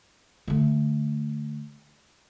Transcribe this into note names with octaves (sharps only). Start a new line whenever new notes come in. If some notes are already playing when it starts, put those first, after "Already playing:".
D3 A3